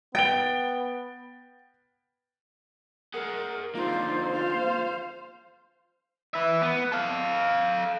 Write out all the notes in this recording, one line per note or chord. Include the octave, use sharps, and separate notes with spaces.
B3 G5 A6 D7 G7
G#4 A#4 F#5
D3 A#3 D#4 F4 C5
C5 F5
B4 E5
B3
A4 F5